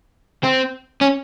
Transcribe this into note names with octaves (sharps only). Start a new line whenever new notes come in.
C4
C#4